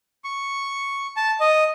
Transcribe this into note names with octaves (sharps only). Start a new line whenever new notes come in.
C#6
A5
D#5